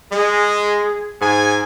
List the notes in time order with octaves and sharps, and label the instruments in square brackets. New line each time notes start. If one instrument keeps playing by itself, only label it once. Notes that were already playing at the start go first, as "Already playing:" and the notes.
[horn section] G#3 [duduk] G#4
[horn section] G#2 G#5